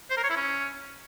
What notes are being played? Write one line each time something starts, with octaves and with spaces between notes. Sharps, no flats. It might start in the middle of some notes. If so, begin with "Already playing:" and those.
C5
A#4
C#5
E4
C#4